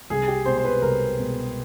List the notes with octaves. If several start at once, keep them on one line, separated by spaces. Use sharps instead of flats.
C2 G#4
G4
B2 G#3 C5
C5
B4
C2 A#4
B2 G#3